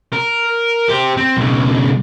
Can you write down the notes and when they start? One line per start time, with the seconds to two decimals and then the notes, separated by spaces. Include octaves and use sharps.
0.13 A#4
0.89 G4 C5
1.17 C4
1.37 B1 C#3